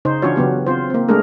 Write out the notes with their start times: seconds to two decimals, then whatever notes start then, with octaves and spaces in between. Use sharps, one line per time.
0.05 C#3 D#4 C5
0.22 E3 C#4 D4 F4 F#4 C#5
0.36 C#3 F#3 B3 G4
0.66 C4 F4 C5
0.90 A#3 C4
1.09 G#3 A3 D4 G#4 A#4